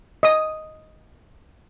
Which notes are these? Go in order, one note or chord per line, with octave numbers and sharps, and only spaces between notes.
D#5 D#6